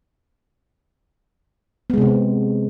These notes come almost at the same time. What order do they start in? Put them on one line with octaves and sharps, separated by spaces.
B3 G#3 C3 C4